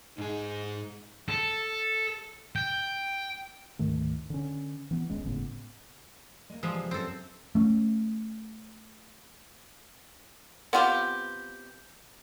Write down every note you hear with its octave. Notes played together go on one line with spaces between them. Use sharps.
G#2 D#4 G#4
A4
G5
D2 G#2 D#3 A3
D3 C#4
E3 B3
D#1 E2 G#3 C#4
G1 A2 C#3 B3
G#3 A#3
E3 F3 G3 G#3 E5 A5
C3
F#2 C4 A4
A3 C#4
B3 C4 F4 G4